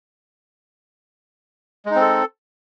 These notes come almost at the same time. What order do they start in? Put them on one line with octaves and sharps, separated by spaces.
G#3 D#4 C4 A4